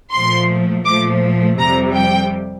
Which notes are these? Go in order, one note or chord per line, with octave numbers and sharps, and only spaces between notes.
A#2 F3 A3 C6
A#2 F3 A3 D6
F2 C3 G3 A#5
G5